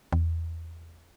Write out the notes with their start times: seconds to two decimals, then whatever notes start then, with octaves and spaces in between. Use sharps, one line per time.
0.12 E2